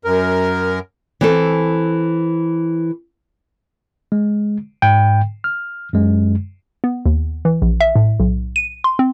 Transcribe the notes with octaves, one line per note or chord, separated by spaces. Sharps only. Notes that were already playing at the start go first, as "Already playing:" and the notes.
F#2 A#4
E3 C4 A4
G#3
G#2 G5
F6
F#2 G#3
B3
D#2
E3
A#1
E5
A2
B1
D#7
C6
C4